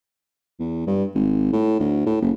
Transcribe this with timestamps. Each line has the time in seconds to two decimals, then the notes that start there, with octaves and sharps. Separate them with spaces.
0.60 E2
0.87 G2
1.15 G#1
1.53 A2
1.80 D2
2.06 A2
2.22 F#1